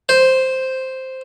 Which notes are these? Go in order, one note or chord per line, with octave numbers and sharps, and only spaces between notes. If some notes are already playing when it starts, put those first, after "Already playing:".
C5